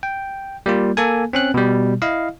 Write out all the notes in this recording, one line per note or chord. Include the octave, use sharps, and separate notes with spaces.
G5
G3 A#3 F4
A#3 A4 G#5
C4 C#4 F#6
B2 G3
E4 D#5 F5